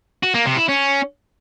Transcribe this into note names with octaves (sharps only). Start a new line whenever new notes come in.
F#4
A#3
C3
E4
C#4